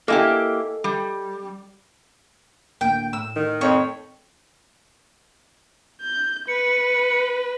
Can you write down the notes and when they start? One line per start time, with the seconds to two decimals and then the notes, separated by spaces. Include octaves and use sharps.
0.08 A#3 E4 G4 A4 D#5 G#5
0.84 G3
2.81 D2 A2 A#3 G5
3.13 A2 E6
3.36 D#3
3.61 F2 C#5
6.02 G6
6.48 B4 C#7